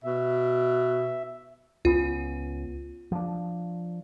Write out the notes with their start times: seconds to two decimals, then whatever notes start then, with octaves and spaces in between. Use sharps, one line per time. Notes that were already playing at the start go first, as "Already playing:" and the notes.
0.04 B2 E5
1.85 C#2 B3 C#4 F4
3.12 F3 D4